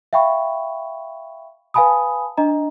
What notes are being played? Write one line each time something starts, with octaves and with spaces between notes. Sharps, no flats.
E5 F5 G5 B5 C#6
B4 F5 G#5 A5 B5 D#6
D4 D#5 A#5